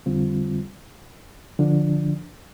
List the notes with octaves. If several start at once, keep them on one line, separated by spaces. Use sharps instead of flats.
F2 D3 G3 C4 F4
D3 F3 D4